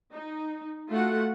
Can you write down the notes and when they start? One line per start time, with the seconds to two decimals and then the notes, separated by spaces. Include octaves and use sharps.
0.13 D#4
0.90 A3 F4 F#4 F#5